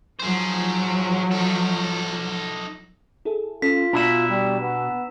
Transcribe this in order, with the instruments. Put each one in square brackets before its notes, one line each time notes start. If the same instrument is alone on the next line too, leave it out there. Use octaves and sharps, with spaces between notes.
[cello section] F3 F#3 [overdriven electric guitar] G#4 C5
[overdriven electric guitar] D#4 A4
[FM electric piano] E4 G#4 A4
[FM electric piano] C#4 A4 [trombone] F4 [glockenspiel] B6
[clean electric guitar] B2 E4 [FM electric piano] D4 [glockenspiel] A#5 E6 E7
[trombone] G3
B3